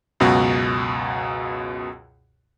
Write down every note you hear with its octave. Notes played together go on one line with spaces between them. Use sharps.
C#2 F#2 B2 F#4